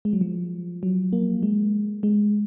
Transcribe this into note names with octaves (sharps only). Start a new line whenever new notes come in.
G#3
F#3
F3
F#3
A#3
G#3
G#3